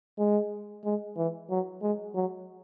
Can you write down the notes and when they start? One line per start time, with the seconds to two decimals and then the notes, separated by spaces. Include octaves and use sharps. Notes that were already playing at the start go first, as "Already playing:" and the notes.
0.18 G#3
0.85 G#3
1.17 E3
1.50 F#3
1.82 G#3
2.15 F#3